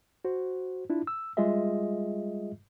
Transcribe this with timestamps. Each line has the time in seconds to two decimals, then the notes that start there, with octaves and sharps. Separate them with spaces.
0.25 F#4 C5
0.90 D4 E4 F4
1.07 E6
1.37 G3 G#3 F4 G#4 D#5 E5